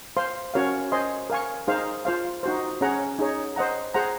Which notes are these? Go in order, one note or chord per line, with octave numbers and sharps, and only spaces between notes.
C5 F5 C6
C#4 F#4 A#4 C#5 F5
C5 D#5 G#5 C6
A#4 F5 G#5 C#6
D#4 G#4 C5 F5
F4 C5 F5
D#4 F#4 C5
C#4 G#4 C#5 F#5 A#5
D#4 G#4 C#5
C5 D#5 F#5 A#5
G#4 C5 F#5 A#5